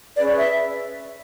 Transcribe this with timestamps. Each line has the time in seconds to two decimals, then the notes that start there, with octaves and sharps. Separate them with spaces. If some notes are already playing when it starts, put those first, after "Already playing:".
0.17 C#4 G#4 B4 D5
0.39 E5